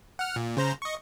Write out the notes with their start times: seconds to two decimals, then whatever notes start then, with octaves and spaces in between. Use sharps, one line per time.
0.19 F#5 F6
0.36 A#2
0.57 C#3 C5 A#5
0.82 D#5 C#6